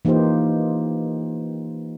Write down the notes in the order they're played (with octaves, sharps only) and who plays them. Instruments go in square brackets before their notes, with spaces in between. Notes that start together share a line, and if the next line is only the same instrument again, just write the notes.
[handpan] E3 A#3 D#4 F4 G4 C5